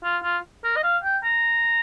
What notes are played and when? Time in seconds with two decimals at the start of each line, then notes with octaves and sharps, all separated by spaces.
0.04 F4
0.24 F4
0.64 A#4
0.76 D#5
0.84 F5
1.04 G5
1.24 A#5